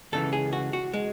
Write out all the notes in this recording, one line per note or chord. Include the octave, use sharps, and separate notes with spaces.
C#2 C#3 E3 A4
G#4
F#4
F#4
G#3